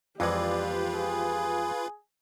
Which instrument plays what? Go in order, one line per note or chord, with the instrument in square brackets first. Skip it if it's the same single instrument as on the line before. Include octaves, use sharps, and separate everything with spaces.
[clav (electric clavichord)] F2 E3 G#3 [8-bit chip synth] F4 B4 [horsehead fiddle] G4 [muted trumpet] D5
[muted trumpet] G#4